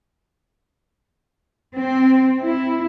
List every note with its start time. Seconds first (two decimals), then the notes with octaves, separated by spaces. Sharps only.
1.75 C4
2.41 E4